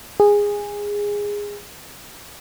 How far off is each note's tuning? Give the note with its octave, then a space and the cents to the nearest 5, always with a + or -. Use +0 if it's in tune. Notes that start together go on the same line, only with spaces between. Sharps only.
G#4 -15